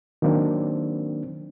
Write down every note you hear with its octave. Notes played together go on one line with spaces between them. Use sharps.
D#3 F#3 A#3 C4 D4